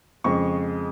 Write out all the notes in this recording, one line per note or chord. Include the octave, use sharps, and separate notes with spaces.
F2 C#3 F3 G#3 C#6